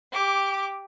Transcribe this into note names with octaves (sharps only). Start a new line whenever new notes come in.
G4 D6